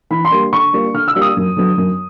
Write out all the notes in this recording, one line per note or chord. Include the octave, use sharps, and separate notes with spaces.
E3 B5
C6
G3 A#3 D4
D3 C#6
G3 A#3 D4 F4
D3 F6
E6
G3 A#3 D4 F4
D#6
F#2
D3 F#3 B3
F#2